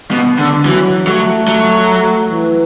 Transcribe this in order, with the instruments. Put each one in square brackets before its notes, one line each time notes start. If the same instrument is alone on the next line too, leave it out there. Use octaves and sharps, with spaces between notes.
[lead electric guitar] B2
D3
[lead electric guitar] E3 [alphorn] F#3
[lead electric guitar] F#3 [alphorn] A3
[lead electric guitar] F#3
[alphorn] E3